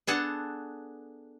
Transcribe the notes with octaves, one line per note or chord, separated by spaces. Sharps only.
B3 D4 G#4 A4 F#5 A5